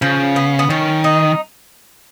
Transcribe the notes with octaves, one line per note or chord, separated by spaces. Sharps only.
C#3 F3
B3
B3
D#3 C#4
D#4